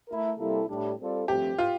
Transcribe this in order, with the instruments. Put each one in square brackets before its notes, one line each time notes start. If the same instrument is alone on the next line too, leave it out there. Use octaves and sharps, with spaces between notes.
[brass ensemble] A3 E4 A#4
C3 G3 A#3 E4 A4
A2 G3 D4
G3 C4 F4 A4 D5
[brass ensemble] G2 F3 A3 C4 [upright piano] G4
[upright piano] F4